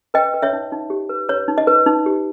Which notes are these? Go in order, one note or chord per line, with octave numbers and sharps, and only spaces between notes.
B4 D#5 G5
B4
C#5 E5
D#4
D#4
G4
B4
B4 C#5
D#4
D#5
B4
D#4
G4